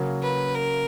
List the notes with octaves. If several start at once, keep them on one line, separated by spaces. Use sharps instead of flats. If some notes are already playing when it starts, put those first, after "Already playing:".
Already playing: C#3 F#3 A#3
B4
A#4